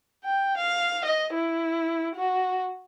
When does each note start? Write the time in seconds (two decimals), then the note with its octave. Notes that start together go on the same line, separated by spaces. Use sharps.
0.24 G5
0.57 F5
1.04 D#5
1.34 E4
2.16 F#4